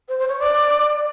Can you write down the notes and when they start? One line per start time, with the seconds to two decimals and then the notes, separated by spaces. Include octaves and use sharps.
0.09 C5
0.19 C5
0.29 C#5
0.39 D5